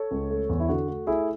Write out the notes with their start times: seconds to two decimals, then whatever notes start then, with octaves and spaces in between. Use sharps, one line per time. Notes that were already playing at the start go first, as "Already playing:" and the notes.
Already playing: A4 C#5
0.11 C#2
0.31 A3
0.49 E2
0.60 E4
0.69 D3 F#4
0.88 A3
1.07 A3 E4 G#4